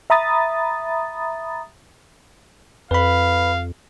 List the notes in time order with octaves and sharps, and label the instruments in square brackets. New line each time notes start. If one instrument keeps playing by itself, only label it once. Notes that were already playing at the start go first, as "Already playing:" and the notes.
[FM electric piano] E5 A#5 B5 D#6 A6
[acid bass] F2 [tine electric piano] B4 B5 [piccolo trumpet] F5